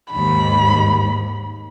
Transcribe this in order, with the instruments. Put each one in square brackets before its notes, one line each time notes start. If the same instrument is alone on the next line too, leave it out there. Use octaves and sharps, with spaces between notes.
[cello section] D#2 G#2 D#3 [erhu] B5